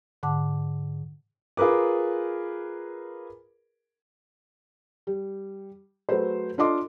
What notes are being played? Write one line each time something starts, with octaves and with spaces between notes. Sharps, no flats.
G#2 D3 F#5 A5 D6
F4 G#4 A#4 B4 D6
G3
F#3 A3 G#4 B4 C5
D4 F4 A4 D#5 C6 D6